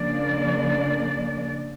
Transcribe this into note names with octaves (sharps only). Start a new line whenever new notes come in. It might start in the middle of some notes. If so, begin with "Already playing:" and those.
Already playing: C#3 F3 A#3 D4 D5